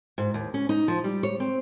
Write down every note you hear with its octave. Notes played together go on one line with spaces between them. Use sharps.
G#2
D#2
C#4
D#4
F3
G3
C#5
C4